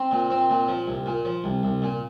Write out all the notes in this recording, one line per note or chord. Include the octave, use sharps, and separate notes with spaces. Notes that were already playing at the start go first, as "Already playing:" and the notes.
Already playing: C4
A#2
C4
A#2
F3
C2
A#2
F3
C2
C2
A#2